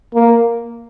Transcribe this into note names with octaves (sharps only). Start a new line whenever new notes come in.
A#3